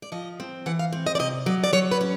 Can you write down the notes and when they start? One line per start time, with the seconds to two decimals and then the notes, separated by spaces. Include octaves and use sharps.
0.02 D5
0.12 F3 D#5
0.40 C4
0.66 E3 F#5
0.79 F5
0.93 C4
1.07 D#5
1.15 D5
1.19 C3 D#5
1.46 F#3 D5
1.64 D5
1.73 F#3 C#5
1.91 B4
2.01 C#4